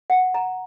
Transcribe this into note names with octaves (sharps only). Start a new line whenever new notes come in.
F#5
A#5